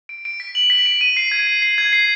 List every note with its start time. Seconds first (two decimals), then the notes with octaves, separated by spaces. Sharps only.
0.09 D7
0.25 D7
0.40 B6
0.55 F#7
0.70 B6
0.86 D7
1.01 D#7
1.17 C7
1.31 G#6
1.47 C7
1.62 C7
1.78 G#6
1.93 C7